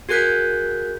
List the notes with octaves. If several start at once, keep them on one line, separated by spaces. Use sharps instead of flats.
F#4 G#4 A#4 F#6 G6 B6